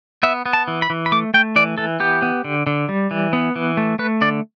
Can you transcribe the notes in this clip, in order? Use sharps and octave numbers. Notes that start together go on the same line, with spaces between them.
B3 E5
B3
A5
E3
B5
E3
B5
A3 D6
A3 G5
E3 D5
E3 A4
B3 G4
B3
D3
D3
G3
E3
B3
E3
A3
A3 B4
D3 D5